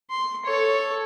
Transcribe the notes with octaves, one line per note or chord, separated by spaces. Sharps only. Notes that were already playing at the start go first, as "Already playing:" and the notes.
C6
A4 C#5